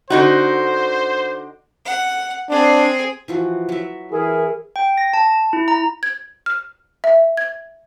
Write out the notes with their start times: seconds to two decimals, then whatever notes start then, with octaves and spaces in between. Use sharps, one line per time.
0.10 D3 D#4 F#4 C5
1.85 F#5
2.49 C4 D4 G#4
3.28 E3 F3 F#4
3.69 F#3 E5
4.12 E3 E4 G#4 A#4
4.76 G5
4.97 A#6
5.14 A5
5.53 E4
5.68 A#5
6.03 G#6
6.46 F6
7.04 E5
7.37 G#6